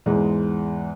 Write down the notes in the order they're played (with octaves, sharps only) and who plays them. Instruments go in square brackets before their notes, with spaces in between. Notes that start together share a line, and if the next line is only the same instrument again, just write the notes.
[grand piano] E2 G#2 G#3